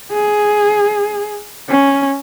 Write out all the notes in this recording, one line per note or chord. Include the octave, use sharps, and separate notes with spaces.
G#4
C#4